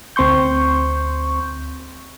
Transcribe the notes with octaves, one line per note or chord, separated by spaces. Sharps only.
D2 C4 C6 C#6 G6